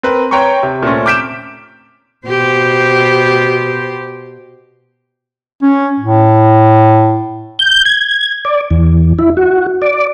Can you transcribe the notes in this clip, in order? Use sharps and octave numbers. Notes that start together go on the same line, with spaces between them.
C4 A#4 B4
B4 C#5 G5 A#5 C6 C#6
C3
A#2 A3 C4 C#4
D6 F6 G6 B6 D7 E7
B2 G4 C5
C#4
A2
G6
G#6
D5
E2
E4
F#4
D5